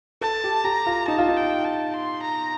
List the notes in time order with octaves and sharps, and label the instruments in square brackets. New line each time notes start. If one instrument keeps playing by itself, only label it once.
[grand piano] A4 [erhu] A5
[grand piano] G4
[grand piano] G4 [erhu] A#5
[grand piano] F4
[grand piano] D#4 [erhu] A5
[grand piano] F4
D#4
[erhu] G5
A5
C6
A#5